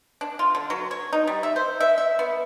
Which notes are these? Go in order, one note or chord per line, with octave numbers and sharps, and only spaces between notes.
D4
F4
D3
F#3
C#5
D#4
G3
E5
C5
E5
E5
B3